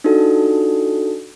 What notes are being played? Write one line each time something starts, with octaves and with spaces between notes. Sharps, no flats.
D4 D#4 F4 F#4 A4